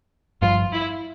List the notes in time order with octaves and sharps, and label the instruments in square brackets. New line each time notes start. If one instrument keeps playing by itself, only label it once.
[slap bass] G1 G2 F3 [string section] F4
[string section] E4